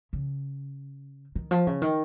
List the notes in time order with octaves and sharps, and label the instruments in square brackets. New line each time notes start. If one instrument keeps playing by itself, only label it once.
[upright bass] C#3
D#3
F3
C#3
D#3